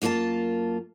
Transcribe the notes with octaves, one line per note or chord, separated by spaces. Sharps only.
F#2 A#3 F4 A#4 A5